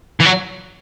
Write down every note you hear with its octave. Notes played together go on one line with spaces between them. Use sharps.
E3
F#3